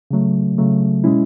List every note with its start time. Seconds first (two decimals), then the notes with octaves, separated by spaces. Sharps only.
0.11 C#3 F#3 A3
0.58 C#3 F#3 A3
1.04 B2 G#3 C#4 E4